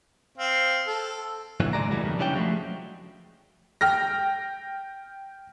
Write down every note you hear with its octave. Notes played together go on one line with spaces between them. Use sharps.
C4 F5
A4
A#2 D3 E3 F#3
C#3 G#3 D5 A#5
C#3 E3 F#3 G3 A3
F2 B2 D#3
C#3 E3 G3 C#4 D4 G5
F3 F#3 G#3 A3
G5 F6 A#6